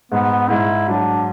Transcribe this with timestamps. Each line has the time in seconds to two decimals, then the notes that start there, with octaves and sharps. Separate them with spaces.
0.12 G#2 B3
0.49 G#2 E4
0.88 F#3 D4